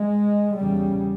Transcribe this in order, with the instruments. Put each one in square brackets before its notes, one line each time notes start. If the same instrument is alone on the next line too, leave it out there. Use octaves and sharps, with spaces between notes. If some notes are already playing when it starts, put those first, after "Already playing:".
Already playing: [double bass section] G#3
E2 C#3 G3